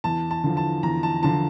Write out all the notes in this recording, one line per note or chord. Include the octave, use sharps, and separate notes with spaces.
E2 A5
A5
D3 F3
A5
E2 A#5
A5
D3 F3 A5